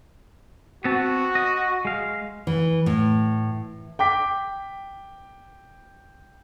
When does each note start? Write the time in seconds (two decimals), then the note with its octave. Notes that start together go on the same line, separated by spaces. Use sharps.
0.84 B3 C4 F#4 A5
1.35 D#5
1.85 G#3 F5
2.47 E3
2.86 A2
3.99 G5 D6 B6